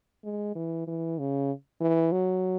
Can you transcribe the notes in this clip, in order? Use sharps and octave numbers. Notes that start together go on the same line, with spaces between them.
G#3
E3
E3
C#3
E3
F#3